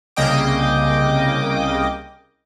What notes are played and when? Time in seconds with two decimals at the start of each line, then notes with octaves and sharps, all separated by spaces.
0.16 C2 C#3 A#3 D#5 G5 D6